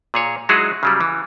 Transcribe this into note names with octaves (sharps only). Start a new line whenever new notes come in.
A#2 G#4 C#5
F#3 G#3 D#4 E4 F#4 G#4
C#3 F#3 G3
E3